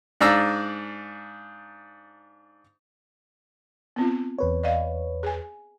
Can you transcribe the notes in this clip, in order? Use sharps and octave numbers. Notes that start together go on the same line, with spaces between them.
G#2 D4 D5 F5 A#5 E6
B3 C4 F4
E2 B4 C#5
D5 D#5 F5
G#4 G#5